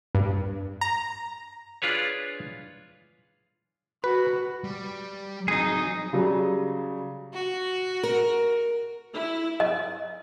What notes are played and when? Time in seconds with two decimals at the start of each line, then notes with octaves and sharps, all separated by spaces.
0.15 G2
0.81 A#5
1.82 D4 F4 G#4 B4 C#5
4.04 F#4 B4
4.64 G3
5.48 F#3 C4 D#4 G#4
6.13 C#3 F#3 G3
7.33 F#4
8.03 A#4
9.13 E4
9.60 D#5